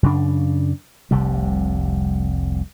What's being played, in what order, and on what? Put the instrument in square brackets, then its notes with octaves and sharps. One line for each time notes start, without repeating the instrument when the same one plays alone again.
[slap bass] F#2 C#3 D4
F1 C2 C3 G3